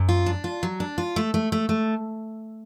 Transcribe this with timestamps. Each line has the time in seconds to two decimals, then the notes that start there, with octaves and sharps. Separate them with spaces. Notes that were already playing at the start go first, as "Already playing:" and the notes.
Already playing: F#2
0.09 F4
0.26 D4
0.44 F4
0.63 F#3
0.80 D4
0.98 F4
1.16 A3
1.34 A3
1.52 A3
1.69 A3